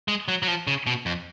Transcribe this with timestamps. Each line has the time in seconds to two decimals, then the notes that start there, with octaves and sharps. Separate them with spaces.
0.08 G#3
0.28 F#3
0.43 F#3
0.48 F3
0.67 C#3
0.87 B2
1.06 F2